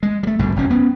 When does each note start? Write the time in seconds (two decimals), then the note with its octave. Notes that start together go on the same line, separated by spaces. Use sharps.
0.03 G#3
0.23 G3 A3
0.39 A#1 G2 B2 D3
0.56 F1 F#3 C#4
0.70 B3 C#4